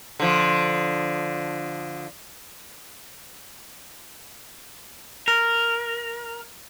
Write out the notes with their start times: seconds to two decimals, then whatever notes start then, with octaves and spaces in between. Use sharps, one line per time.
0.20 D3 F3
5.28 A#4